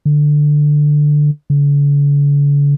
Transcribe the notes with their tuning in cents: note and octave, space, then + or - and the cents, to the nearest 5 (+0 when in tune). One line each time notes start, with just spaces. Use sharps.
D3 +10
D3 -45